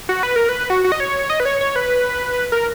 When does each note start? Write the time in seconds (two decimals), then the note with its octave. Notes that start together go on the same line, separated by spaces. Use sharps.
0.09 F#4
0.23 B4
0.36 A#4
0.49 B4
0.70 F#4
0.84 F#4
0.92 D#5
1.00 C#5
1.30 D#5
1.40 B4
1.45 C#5
1.61 C#5
1.76 B4
2.52 A#4